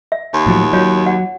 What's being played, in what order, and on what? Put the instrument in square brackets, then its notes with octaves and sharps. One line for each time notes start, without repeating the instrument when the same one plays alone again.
[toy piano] E5
[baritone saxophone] D#2
[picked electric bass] A2 F3 F#3
[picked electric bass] F#3 [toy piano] F4 C#5
[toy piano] F#5